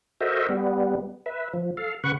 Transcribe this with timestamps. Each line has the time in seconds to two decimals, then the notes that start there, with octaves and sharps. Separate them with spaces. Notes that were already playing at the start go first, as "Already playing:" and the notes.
0.21 F#4 A4 A#4 C5 D#5 E5
0.49 G3 B3
1.26 B4 E5
1.53 F3
1.77 A4 F5
2.04 C#3 B4 F#5 C#6